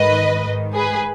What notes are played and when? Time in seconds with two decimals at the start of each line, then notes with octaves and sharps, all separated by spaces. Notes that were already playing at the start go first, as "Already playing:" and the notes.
Already playing: G#2 D#3 B4 D#5
0.43 G#2 D#3
0.74 G#4 B4